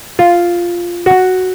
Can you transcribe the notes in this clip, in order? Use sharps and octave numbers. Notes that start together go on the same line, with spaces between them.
F4
F#4